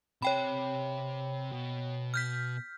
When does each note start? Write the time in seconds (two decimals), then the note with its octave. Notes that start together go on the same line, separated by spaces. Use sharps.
0.22 C3 G4 C#5 G5 B5
1.52 B2
2.14 F6 G6 B6